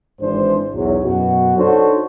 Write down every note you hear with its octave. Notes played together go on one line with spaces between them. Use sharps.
G#1 G#2 E3 D4 C5
B1 E2 F#3
F#2 B2 F#4
D4 D#4 F#4 A4 C5 C#5